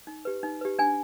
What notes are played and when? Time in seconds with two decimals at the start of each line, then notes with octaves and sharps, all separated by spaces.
0.07 D#4
0.25 G4 B4
0.43 D#4
0.61 G4 B4
0.79 D4 G#5